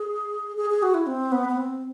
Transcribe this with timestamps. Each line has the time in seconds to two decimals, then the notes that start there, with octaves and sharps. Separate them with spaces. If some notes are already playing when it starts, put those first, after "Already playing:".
Already playing: G#4
0.56 G#4
0.70 G#4
0.82 F#4
0.94 E4
1.06 C4
1.32 B3
1.48 B3
1.57 C4